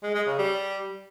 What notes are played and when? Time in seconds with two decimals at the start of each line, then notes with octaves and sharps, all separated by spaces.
0.03 G#3
0.15 G#3
0.26 C#3
0.38 G3